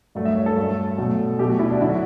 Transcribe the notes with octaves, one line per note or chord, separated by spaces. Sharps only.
G2 F#3 A3
E5
C#5
A4
G2 F#3 A3
B2 F#3 A3
B2 F#3 A3 G4
F#4
E4
D4
D3 F#3 E4
F#4